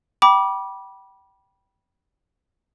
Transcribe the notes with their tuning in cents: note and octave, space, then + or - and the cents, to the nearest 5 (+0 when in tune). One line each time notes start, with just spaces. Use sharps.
G5 -20 B5 -25 D6 +0